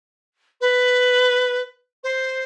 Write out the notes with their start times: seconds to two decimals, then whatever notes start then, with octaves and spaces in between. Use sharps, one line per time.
0.60 B4
2.03 C5